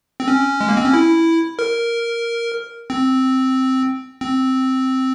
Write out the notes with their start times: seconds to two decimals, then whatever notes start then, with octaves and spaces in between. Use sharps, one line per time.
0.20 C4
0.28 C#4
0.61 G#3
0.69 A#3
0.77 C4
0.85 C#4
0.93 E4
1.59 A#4
2.90 C4
4.21 C4